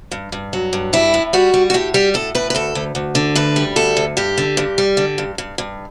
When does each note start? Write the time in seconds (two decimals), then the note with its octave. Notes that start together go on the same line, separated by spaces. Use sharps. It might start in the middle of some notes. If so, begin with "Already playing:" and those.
0.11 G2
0.32 G2
0.53 F#3
0.73 G2
0.93 G3 E4
1.14 A2
1.33 G3 F#4
1.54 G3
1.70 F#4
1.74 A2 G4
1.94 G3 G4
2.14 A2 A4
2.35 A2 B4
2.50 B4
2.55 D2 A4
2.75 D2
2.95 D2
3.15 D3
3.35 D2 B4
3.56 G3
3.76 D2 A4
3.97 D2
4.17 G2 G4
4.38 D3
4.57 G2
4.78 G3
4.97 D3
5.18 G2
5.38 G2
5.58 G2